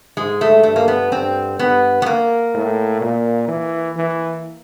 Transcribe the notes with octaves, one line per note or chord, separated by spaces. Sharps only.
G#2 G#3
A3
G2 A3
A#3
B3
G2 C4
G2 B3
B3
A#3
A2
A#2
E3
E3